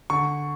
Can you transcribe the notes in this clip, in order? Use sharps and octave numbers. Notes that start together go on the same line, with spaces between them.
D3 C#6